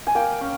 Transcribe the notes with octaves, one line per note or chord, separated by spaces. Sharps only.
G#5
A#3 G5
C#4